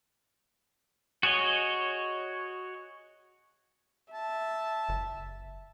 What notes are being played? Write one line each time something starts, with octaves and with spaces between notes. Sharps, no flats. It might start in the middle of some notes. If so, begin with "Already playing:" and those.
F#4 G#4 C#5 D#5
E5 A5
F#1